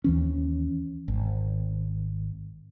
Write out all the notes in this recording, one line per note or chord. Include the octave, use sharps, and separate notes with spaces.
D#2 E3 C#4
G#1